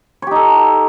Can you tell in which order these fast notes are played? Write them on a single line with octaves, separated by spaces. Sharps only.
C#5 G4 D#4 A4